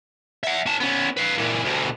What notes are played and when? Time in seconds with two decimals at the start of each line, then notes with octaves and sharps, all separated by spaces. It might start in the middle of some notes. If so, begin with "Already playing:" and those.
0.44 E5 F#5
0.66 C#4 A5
0.80 B3 C#4
1.17 B4 F5
1.38 A#2 E3
1.64 D2 B2